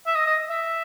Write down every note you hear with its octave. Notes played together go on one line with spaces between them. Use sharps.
E5
D#5
D#5
E5